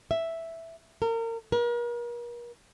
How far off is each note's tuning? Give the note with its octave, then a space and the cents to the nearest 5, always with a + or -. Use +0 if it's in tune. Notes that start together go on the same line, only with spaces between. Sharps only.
E5 +0
A#4 -30
A#4 +40